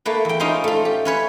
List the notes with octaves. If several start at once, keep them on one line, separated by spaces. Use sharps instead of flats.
A3 A#3 B4
E2 G5
C#4 D#4 F4 C5
A3 F4
G4
C#4 B4 C#5